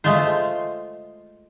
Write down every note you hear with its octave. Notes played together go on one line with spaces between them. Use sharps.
G#3 A3 F4 C5